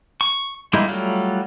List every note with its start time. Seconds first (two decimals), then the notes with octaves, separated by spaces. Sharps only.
0.21 C#6
0.73 G3 G#3 A#3 D#4 E4
0.88 F#3 G3 A3 F4